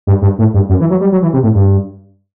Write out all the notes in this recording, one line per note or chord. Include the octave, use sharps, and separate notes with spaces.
G2
G2
A2
G2
F#2
E3
F#3
G3
F#3
E3
C3
A2
G2